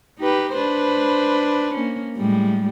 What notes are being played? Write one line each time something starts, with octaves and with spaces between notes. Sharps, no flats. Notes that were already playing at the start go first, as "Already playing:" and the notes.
D#4 G4 B4
D4 B4 C5
A#3 C#4
A2 G3 G#3